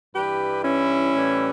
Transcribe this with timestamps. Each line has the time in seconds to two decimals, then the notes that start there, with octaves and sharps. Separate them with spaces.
0.15 G2 E3 G3 G4 B4
0.64 C#4 E4
1.13 A2 E3 G3